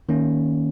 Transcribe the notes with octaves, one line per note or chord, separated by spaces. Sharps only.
D#3 A#3 C#4